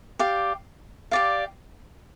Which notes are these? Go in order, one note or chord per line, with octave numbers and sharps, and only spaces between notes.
G4 D5 F5
G4 D5 F5